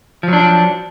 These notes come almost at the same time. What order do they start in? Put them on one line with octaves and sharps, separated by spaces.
F3 F#3 D4